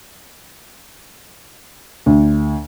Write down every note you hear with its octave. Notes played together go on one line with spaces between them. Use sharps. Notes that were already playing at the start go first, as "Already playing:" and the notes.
D2